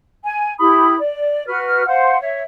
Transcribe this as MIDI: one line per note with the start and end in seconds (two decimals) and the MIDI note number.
0.23 0.53 80
0.59 0.96 64
0.59 0.96 67
0.59 0.96 83
0.59 0.96 87
0.97 1.43 74
1.46 1.85 66
1.46 1.85 71
1.46 1.85 89
1.87 2.17 72
1.87 2.17 77
1.87 2.17 78
2.20 2.42 73
2.20 2.42 76